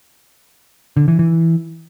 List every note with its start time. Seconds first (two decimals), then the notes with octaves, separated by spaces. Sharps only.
0.97 D3
1.08 E3
1.19 E3